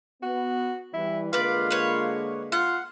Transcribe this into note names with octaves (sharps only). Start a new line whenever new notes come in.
B3 F#4
E3 G3 E4
D3 G#3 A#3 F4 B4 D5
B4 C#5
F4 F#5